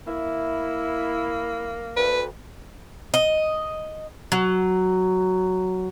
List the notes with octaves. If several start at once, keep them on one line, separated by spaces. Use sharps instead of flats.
A#3 E4
D2 B4
D#5
F#3